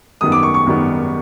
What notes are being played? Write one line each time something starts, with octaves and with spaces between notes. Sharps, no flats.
G#1 F#2 D#3 G3 B3 D#6
D6
C#6
C#6
G#1 F#2 D#3 G3 B3